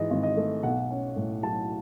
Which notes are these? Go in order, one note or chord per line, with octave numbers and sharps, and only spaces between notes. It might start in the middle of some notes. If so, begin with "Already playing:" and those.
Already playing: G#2 E3 D#5
G#1
D#5
A3
B1 F#5
C#4
A2
F#3 A5